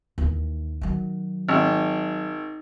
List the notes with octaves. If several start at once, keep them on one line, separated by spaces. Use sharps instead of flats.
D#2 E3
D#3 F#3
G#1